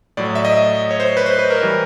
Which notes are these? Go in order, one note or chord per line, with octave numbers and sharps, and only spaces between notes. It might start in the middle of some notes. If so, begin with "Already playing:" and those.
A2 F#3 D5
E5
D#5
C#5
C5
B4
C5
B4
A#4
E3 G3